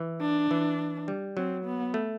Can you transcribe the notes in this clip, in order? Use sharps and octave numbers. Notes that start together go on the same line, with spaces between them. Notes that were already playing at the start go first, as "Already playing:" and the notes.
Already playing: E3
D4
E3
G3
F#3 C4
B3
A3